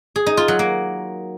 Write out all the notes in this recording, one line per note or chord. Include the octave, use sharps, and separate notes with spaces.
G#4
D#4
F4
F#3
A#3